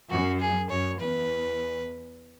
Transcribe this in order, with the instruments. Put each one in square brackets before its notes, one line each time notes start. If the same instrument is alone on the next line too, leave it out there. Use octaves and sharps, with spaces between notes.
[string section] F#2 [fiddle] F#4
[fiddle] G#4
[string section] F#2 [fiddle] C#5
[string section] E2 [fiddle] B4